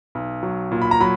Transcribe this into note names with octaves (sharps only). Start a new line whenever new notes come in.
B1
F#3
A#2
B5
A#5
F#3 B5